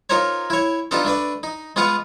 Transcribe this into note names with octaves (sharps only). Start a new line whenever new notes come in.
D#4 F4 A#4 C5 C#5
E4 C#5
B3 D4 D#4 F4 G4 A4
A3 D4 B4 D5
D#4
G#3 B3 F4 B4 F5 F#5